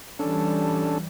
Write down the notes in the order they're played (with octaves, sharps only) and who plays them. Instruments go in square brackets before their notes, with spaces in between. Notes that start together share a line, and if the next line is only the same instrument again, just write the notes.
[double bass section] E3 G3 [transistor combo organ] C#4 D4 A4